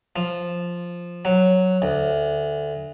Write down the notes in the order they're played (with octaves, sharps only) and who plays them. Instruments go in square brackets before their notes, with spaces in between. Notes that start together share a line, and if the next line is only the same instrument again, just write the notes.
[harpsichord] F3
F#3
D2